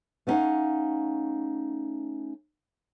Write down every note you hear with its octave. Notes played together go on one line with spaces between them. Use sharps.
A3 B3 C#4 D#4 F5 F#5